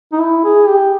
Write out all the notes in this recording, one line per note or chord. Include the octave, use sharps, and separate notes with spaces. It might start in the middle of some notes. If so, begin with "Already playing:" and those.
D#4
E4
G#4
G4